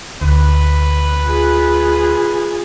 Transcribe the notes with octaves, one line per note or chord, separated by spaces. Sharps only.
D2 B4
F4 G#4